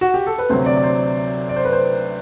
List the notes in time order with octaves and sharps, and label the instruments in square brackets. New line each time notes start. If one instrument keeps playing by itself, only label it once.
[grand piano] F#4
G4
A4
B4
[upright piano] D2 C3 F#3 [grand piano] C5
[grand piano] D5
D5
C5
D5
C5
B4
C5